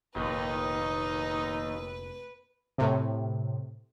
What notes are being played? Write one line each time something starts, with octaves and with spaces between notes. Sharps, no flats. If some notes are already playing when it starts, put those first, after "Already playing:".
F1 D#2 A#2 D#4 B4
A2 C3